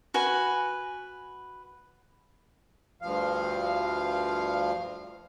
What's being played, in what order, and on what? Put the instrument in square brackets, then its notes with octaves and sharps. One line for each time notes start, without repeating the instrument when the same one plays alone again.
[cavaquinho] F#4 B4 G#5
[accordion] D2 G2 F3 F5